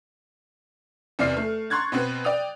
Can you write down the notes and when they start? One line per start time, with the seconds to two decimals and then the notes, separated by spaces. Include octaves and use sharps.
1.19 E2 C3 D5 F6 C7
1.37 A3
1.70 A#5 C6 C#6 F#6 G#6 A6
1.92 B2 B3 C4 B4
2.24 D5 G5 D#6 F7